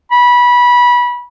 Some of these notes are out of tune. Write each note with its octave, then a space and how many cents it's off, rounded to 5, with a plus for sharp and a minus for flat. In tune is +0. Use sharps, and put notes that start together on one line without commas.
B5 -20